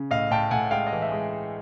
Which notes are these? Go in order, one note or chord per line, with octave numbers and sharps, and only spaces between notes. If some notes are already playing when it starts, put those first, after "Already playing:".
Already playing: C#3
A2 D#5 F5
A2 G5 A5
A2 F#5 G#5
G#3 F5 G5
D#5
E3
E5
G#3